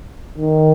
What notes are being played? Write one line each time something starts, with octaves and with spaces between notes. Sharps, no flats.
D#3